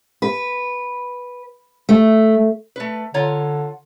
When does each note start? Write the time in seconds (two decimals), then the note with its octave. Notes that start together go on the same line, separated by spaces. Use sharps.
0.22 B4
1.89 A3
2.76 A3 B4
3.14 D3 F4 C#5 A#5